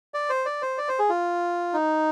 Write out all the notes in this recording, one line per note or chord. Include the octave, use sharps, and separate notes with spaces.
D5
C5
D5
C5
D5
C5
G#4
F4
D#4